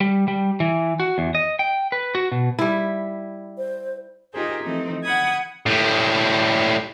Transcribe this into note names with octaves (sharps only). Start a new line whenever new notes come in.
G3
G3
E3
F#4
E2
D#5
G5
B4
F#4
B2
G3 E4
C5
D#4 F4 G4 G#4 A#4 C5
E3 F3 A3 C4 D#4
F#5 B5 D#6 G#6
A2 G3